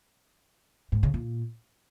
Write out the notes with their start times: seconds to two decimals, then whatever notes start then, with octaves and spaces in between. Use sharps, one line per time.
0.92 G#2
1.03 C#3
1.14 A#2